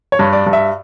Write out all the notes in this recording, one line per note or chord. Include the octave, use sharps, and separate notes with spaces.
C#5
G2
D5
G2
E5